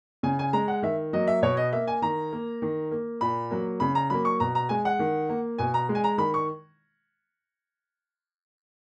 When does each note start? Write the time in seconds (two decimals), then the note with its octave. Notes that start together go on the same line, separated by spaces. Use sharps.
0.23 C#3 G#5
0.39 G#5
0.53 G#3 A#5
0.68 F#5
0.83 D#3 E5
1.13 F#3 A#3 D#5
1.27 E5
1.42 B2 C#5
1.57 D#5
1.72 A#3 E5
1.87 G#5
2.02 D#3 A#5
2.32 A#3
2.62 D#3
2.91 A#3
3.21 A#2 B5
3.50 F#3 A#3
3.80 C#3 B5
3.95 A#5
4.10 F#3 A#3 B5
4.25 C#6
4.40 B2 A#5
4.55 A#5
4.69 G#3 G#5
4.85 F#5
4.99 D#3
5.29 A#3
5.58 B2 G#5
5.74 A#5
5.89 G#3
5.95 G#5
6.04 A#5
6.18 D#3 B5
6.34 C#6